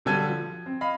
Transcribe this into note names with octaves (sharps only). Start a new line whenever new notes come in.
B1 D3 G3 A4 G#6 D#7
F3
C4
D#5 F5 B5